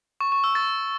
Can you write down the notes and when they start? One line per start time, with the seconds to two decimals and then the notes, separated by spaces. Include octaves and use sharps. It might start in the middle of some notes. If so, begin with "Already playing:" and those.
0.21 C#6
0.32 C#6
0.44 E6
0.55 A6